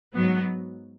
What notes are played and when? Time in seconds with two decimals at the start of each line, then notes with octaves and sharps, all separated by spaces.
0.14 G#2 F#3 B3